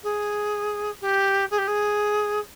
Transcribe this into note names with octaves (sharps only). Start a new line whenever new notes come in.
G#4
G4
G#4
G4
G#4